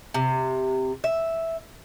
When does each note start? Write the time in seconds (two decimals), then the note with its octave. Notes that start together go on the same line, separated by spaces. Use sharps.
0.14 C3
1.04 E5